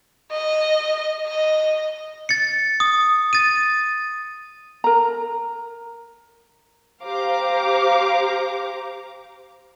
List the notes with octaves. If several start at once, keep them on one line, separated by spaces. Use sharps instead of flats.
D#5
D#5
A6 C#7
D#6
A6 D#7
A#4 A#5
G4 C5 F5 A#5 D6